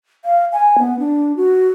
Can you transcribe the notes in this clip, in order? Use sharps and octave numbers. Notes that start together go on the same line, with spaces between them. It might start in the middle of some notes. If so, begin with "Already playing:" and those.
F5
G#5
B3
D4
F#4